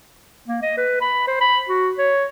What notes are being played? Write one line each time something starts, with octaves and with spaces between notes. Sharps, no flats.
A#3
D#5
B4
B5
C5
B5
F#4
C#5